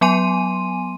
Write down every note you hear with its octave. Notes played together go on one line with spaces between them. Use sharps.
F#3 B3 G#5 C6 D#7